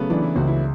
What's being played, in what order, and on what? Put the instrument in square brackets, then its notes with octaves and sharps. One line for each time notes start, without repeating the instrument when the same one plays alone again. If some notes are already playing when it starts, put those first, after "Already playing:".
Already playing: [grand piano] C#3 [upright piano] F#3 A3 B3
[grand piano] E3 [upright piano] D4
[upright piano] E4
[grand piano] C#2 [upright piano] F#4
[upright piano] E4